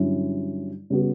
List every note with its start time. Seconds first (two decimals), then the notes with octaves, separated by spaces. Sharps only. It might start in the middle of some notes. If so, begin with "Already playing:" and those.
Already playing: G2 D3 F#3 C#4 E4
0.90 C#3 G3 B3 F#4